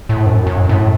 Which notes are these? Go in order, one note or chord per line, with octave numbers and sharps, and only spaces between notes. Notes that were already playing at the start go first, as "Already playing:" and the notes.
A2
F#2
F#2
A2